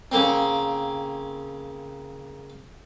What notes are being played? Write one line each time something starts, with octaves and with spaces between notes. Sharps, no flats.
C#3 A#3 C4